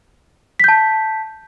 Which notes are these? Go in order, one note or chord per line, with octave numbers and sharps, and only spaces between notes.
A5 G6 B6